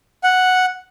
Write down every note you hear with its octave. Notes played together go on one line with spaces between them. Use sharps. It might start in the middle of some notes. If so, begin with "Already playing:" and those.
F#5